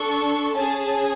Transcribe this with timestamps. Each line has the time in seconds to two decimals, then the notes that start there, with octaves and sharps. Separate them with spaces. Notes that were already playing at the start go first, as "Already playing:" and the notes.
Already playing: D4 A4 C#6
0.55 C#4 G#4 A5